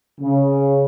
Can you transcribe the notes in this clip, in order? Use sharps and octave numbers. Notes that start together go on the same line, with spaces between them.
C#3